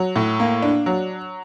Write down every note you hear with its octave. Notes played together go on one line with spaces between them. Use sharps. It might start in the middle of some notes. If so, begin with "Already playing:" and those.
Already playing: F#3
A2
A#3
D4
F#3